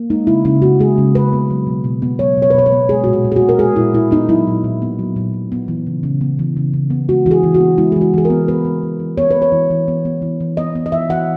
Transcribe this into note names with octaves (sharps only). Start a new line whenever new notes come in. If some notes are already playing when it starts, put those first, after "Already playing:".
Already playing: A#3
G#3 D#4
C#3 E4
C#3 E4
B3 F#4
G#3 G#4
C#3
C#3 B4
B3
F#3
B2
B2
B3
F#3 C#5
B2
C#5
B4
B2 C#5
B4
B3
G#3 G#4
A#2 F#4
G#4
A#2
G#4
F#4
B3
A#4
G#3 G#4
A#2 E4
A#2 E4
B3 D#4
F#3 E4
A#2
A#2
B3
F#3
A#2
A#2
B3
E3
C#3
C#3
B3
E3
C#3
C#3
B3
G#3 F#4
E3 F#4
G#4
E3
F#4
B3
G#3 E4
G#4
E3 F#4
E3 G#4
A#4
B3
B3 B4
B3
E3
E3
B3 C#5
B4
B3
C#5
E3
E3
B3
B3
E3
E3
B3 D#5
B3
D#5
E3 E5
E3 F#5